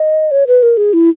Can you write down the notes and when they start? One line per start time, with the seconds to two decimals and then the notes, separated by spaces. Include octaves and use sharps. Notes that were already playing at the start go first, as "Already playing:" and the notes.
Already playing: D#5
0.31 C#5
0.47 B4
0.63 A#4
0.77 G#4
0.93 E4